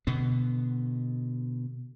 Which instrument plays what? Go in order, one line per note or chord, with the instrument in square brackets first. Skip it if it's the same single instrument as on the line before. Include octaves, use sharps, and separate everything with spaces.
[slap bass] B2 D3 B3